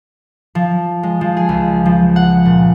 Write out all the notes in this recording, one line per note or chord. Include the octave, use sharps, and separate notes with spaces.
F3
G#3
F3
G#4
C#2
F3
F#5
A#2